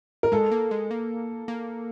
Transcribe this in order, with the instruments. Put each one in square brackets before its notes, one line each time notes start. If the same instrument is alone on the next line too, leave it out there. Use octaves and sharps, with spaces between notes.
[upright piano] A#4
[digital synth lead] G#3 [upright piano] A4
[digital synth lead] A#3
G#3
A#3
A#3